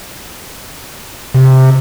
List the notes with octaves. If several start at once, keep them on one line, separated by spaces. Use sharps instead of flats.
C3